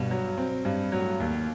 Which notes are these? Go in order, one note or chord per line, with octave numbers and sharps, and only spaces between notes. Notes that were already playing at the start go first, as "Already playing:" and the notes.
Already playing: G2 B2
F#3
C4
G2
A2 F#3
D#2